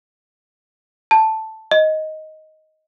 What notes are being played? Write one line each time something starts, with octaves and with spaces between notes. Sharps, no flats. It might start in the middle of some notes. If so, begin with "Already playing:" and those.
A5
D#5